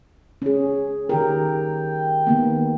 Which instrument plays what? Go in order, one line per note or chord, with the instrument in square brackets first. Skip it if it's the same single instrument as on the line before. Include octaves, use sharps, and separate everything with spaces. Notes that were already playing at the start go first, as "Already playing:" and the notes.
[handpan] C#4 G#4
[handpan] D#3 G4 A#4 [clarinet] G5
[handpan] D#3 A#3 B3